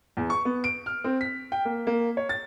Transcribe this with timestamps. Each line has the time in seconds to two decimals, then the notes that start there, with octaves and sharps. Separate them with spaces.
0.17 E2
0.30 C#6
0.45 B3
0.64 D7
0.86 F6
1.04 C4
1.21 B6
1.52 G5
1.65 A#3
1.87 A#3
2.17 C#5
2.29 A6